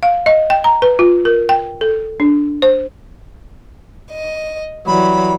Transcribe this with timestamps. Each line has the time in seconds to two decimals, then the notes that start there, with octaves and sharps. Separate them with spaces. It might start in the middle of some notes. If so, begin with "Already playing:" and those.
0.03 F5
0.26 D#5
0.50 G5
0.64 A#5
0.82 B4
0.99 F4
1.25 A#4
1.49 G5
1.81 A4
2.20 D4
2.62 C5
4.11 D#5
4.87 E3 F#3 G3 B5